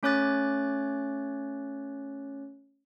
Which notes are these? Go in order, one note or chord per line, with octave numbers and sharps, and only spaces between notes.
A3 C#4 C#5 D6 F#6 A6